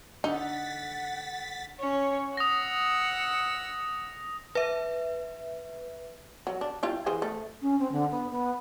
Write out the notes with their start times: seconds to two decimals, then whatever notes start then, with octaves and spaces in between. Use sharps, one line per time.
0.24 D3 D#4 F#5 A6 B6
1.79 C#4 C#5
2.37 F#5 D#6 E6 A#6
4.55 B4 E5
6.47 F#3
6.61 D4
6.83 G3 E4 F4
7.06 E3 G#4 C5
7.22 A3
7.61 C#4
7.79 C4
7.91 D3
8.11 B3
8.31 B3